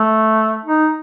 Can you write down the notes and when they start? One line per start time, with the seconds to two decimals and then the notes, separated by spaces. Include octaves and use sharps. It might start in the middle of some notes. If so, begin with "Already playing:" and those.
Already playing: A3
0.65 D#4